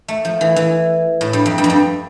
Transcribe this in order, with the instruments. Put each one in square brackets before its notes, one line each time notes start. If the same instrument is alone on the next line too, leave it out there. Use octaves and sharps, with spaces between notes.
[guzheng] A3
F3
E3
E3
A2
G2
F2
G2
F2
G2